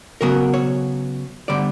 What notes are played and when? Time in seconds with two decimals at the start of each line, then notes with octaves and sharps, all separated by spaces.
0.21 C#3 F#3 B3 A#4
0.53 C#5
1.48 D3 G3 B3 D5